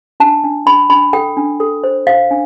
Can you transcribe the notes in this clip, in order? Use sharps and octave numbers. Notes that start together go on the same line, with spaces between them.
D4 A5
D4
D4 B5
D4 B5
A4 G5
D4
A4
C5
C5 F5
D4